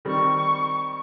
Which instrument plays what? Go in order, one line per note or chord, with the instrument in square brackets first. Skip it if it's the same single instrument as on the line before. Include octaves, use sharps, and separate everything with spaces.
[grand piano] D#3 G3 C4 [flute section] C#6